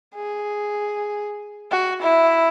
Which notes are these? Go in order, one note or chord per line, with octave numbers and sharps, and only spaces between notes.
G#4
F#4
E4